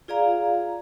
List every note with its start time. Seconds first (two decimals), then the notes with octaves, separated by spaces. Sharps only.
0.08 F4 G#4 D5 F5 A#5